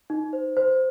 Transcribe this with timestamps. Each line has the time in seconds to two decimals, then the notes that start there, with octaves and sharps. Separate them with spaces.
0.10 D#4
0.33 C5
0.57 C5